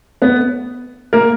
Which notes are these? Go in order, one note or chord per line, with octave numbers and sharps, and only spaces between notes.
B3 B4
A#3 A#4